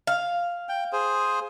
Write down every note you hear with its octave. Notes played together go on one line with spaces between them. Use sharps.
F5
G5
G#4 C5